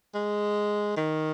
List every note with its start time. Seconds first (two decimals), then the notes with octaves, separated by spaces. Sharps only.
0.15 G#3
0.97 D#3